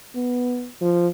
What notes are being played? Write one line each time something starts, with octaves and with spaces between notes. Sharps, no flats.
B3
F3